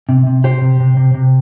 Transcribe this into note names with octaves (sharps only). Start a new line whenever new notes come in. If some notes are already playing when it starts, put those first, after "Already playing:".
C3
C3
C3 G4 C5
C3
C3
C3
C3